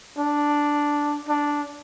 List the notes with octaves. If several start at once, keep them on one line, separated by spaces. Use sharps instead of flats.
D4
D4